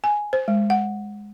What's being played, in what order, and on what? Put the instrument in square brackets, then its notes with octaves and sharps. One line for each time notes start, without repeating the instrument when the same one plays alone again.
[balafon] G#5
C5
G#3
F#5